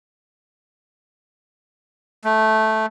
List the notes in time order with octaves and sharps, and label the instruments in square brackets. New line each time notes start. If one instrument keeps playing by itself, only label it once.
[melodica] A3